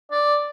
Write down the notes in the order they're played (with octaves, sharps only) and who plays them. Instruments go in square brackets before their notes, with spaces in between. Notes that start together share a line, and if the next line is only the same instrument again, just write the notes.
[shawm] D5